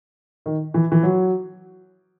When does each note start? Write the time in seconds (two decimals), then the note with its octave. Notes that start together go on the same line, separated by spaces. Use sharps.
0.46 D#3
0.74 E3
0.92 E3
1.03 F#3